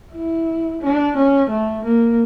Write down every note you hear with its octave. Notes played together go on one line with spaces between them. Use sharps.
E4
D4
C#4
A3
A#3